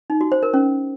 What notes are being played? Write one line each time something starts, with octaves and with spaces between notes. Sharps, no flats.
D#4
F#4
C5
A#4
C#4